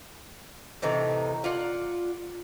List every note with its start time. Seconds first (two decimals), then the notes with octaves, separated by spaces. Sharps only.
0.82 A2 C3 E3 D#4
1.44 F4 D5 F#5